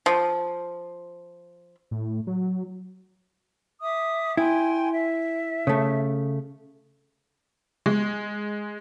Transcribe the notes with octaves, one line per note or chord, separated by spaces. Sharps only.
F3
A2
F#3
E5 D6 D#6
E4 G5 G#5 C6
E5
C#3 A3
G#3